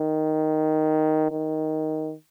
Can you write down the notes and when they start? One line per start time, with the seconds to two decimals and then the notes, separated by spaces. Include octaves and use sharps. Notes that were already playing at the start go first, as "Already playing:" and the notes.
Already playing: D#3
1.31 D#3